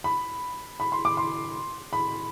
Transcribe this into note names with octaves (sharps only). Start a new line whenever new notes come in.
B5
B5
C6
D6
C6
B5